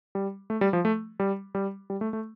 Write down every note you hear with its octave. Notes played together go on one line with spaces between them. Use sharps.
G3
A3
G3
F3
A3
G3
G3
G3
A3
A3